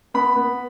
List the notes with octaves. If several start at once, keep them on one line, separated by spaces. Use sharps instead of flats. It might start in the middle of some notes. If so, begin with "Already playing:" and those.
B3 B5
B3